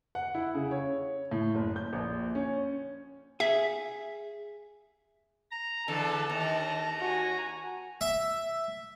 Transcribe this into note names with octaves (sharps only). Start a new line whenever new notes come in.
F#5
E4
C#3
C#5
A2
F#1
G6
A#1
C#4
G#4 E5
A#5
E2 D3 A4 A5
D#2 A#5
F#4 G#5
E5